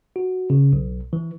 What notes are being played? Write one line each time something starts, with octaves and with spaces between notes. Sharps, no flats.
F#4
C#3
B1
E3